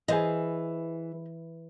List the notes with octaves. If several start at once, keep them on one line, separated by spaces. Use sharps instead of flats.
E3 G#4 C5 D#5